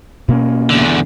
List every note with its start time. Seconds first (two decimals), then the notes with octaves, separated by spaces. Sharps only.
0.28 B2 A#3 C#4
0.70 E2 D3